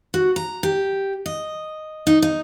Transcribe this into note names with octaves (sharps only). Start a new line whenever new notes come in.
F#4
A#5
G4
D#5
D#4
D#4